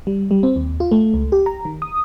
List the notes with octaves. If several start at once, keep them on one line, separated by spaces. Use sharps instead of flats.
G3
G3
C4
D#2
F4
A3
C#2
G4
A#5
D#3
D#6